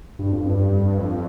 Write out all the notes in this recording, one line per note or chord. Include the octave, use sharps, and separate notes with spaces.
G2
F2
G2
F2